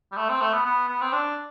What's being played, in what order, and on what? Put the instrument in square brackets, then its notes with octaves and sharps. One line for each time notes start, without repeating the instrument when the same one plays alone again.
[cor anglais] G3
A3
C4
A3
B3
B3
B3
C4
D4